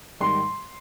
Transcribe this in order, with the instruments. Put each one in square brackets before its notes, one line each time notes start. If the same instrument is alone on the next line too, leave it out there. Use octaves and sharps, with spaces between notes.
[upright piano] G#2 D#3 G3 C6